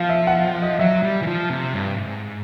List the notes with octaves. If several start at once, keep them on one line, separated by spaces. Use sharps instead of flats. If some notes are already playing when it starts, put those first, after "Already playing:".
Already playing: F3 F5
E5
F#5
D#5
F#3 E5
G3
E3
F3
C3
G2
G#2